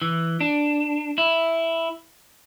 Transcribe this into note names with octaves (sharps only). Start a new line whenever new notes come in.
E3
D4
E4